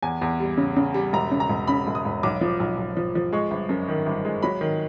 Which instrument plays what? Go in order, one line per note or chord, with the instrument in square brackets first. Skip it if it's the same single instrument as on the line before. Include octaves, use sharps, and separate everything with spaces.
[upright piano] E2 G#5
E2
G3
C#3
C#3
G3
E1 A#5
C#3
A#5
E1
C#3 B5
E1
D#6
E1
B1 D6
F3
B1
B1
F3
F3
G#3 C#6
G1
F#2
D#3
G1
G#3
F#3 B5
D#3